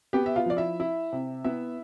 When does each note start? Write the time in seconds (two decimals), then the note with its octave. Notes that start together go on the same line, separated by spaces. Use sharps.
0.13 B3 G4 G5
0.26 E5
0.36 F4 F5
0.46 F3 D5
0.57 E4 E5
0.80 E4
1.12 C3
1.44 B3 E4 E5